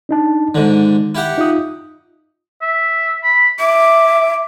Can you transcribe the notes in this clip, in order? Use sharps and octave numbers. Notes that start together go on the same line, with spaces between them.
D4 D#4 A5
G#2 D3 D#3
E4 G4 F#5
D#4 F4 D#6
E5
B5
E5 D6